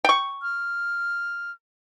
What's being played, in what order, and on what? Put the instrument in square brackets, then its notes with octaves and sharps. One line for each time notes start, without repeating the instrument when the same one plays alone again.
[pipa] G5 C#6
[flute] F6